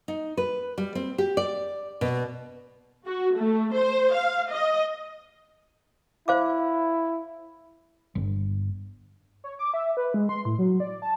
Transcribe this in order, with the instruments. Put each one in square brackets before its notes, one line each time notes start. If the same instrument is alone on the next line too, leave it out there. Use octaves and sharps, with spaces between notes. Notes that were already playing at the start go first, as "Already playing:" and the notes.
[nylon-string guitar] D#4
B4
G3
C4
G4
D5
B2
[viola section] F#4
A3
C5
F5
D#5
[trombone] E4 [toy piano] C5 F5 D6
[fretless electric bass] G1
[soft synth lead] C#5
D6
E5
B4
G#3
C6
A2
F#3
D5
A5